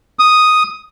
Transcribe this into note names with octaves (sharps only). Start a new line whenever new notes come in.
D#6